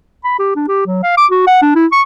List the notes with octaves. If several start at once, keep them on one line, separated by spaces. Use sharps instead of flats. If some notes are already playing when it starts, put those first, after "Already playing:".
B5
G4
D4
G4
F#3
F5
D6
F#4
F#5
D4
E4
C#6